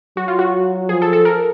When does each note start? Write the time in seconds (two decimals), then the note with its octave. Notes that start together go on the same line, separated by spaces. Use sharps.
0.17 F#3 F#4
0.28 F4
0.39 F#4
0.89 F3 G#4
1.02 A4
1.13 A4
1.25 A#4